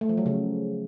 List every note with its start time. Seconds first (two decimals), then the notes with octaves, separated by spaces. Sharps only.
0.01 A3
0.09 F3
0.18 F#3
0.26 C#3